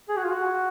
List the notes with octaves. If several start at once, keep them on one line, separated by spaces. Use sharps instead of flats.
G#4
F#4
F4
F#4